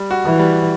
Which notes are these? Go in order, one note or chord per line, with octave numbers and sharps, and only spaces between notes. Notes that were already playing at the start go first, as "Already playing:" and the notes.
Already playing: G3
F#4
E3
G3